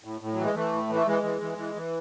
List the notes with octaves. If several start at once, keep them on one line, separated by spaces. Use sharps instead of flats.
A2
A2
E3 F#3
G#3
E3 A3
A2
E3
A3
E3 G#3
E3
E3
E3
E3